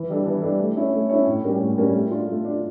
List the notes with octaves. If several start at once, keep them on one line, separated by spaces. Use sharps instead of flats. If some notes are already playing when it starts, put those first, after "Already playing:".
Already playing: E3
G3 D4 A4
E3
G3 D4 A4
A3
C#4 E4 A4 C#5
A3
C#4 E4 A4 C#5
A2
G3 A#3 C#4 G4
A2
G3 A#3 C#4 G4
A3
D4 F4
A3
D4 F4